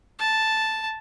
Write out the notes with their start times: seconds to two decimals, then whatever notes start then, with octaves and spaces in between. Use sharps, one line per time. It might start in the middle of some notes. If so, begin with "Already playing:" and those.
0.19 A5